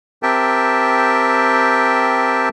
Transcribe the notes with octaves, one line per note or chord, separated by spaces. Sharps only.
C4 G4 A#4 E5 G5 A5